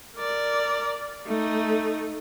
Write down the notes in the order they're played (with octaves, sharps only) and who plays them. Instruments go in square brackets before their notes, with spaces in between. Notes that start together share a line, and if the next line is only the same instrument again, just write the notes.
[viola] A#4 D5
A3 D#4